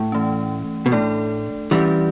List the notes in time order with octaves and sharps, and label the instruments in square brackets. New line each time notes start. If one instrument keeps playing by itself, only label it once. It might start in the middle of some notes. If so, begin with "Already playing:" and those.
Already playing: [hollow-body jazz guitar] A2
[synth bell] E3 A3 C#4
[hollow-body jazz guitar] B2
[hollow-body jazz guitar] A2 [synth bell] A3 D4 A4 D5
[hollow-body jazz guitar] E3 G3 [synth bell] C#4 G4 D5